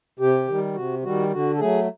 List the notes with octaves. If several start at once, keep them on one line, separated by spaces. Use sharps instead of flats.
C3 G4
D#3 G3
C3 F#4
D#3 G3 F#4
D3 F#4
A4
F#3 A3 G#4